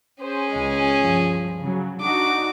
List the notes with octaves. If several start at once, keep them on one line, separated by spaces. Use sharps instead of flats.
C#4 G#4 C5
C#2 G#3
G2 F3
C#3 F#3
D4 D#4 F#4 D6